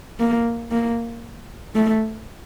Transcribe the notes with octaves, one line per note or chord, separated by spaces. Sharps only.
A#3
A#3
A3